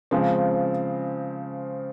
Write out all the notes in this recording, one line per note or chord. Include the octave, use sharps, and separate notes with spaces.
C#3 F3 G#3 C4